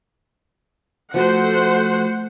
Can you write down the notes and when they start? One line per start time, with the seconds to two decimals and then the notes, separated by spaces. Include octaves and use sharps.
1.14 F3 A3 F#4 C5 F#5